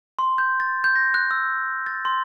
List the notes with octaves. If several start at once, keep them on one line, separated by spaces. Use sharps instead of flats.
C6
G6
A6
G6
A#6
F#6
E6
A6
C6